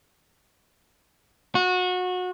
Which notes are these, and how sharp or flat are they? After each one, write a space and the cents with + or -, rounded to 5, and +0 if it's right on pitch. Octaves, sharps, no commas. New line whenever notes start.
F#4 -25